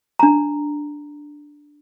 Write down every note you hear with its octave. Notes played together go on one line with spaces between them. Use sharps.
D4 A#5